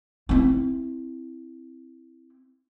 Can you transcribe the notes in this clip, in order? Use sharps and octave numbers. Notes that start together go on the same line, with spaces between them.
C4 E4